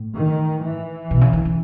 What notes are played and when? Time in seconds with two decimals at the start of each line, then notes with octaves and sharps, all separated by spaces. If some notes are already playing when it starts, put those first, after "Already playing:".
Already playing: A2
0.17 D#3
0.63 E3
1.11 B2
1.21 C#3
1.33 D#3
1.45 C#3